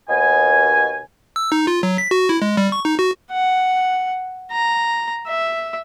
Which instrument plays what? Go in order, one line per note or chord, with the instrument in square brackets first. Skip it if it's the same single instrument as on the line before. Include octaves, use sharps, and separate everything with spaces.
[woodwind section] D#2 B2 G#5
[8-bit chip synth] E6
D#4
F4
F#3
B6
F#4
E4
G#3
G3
C#6
D#4
F#4
[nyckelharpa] F#5
A#5
E5